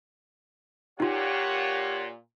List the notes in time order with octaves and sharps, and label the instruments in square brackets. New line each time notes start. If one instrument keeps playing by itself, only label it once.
[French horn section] A#2 [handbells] D#4 F4 [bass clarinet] G4 [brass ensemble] C#5 F#5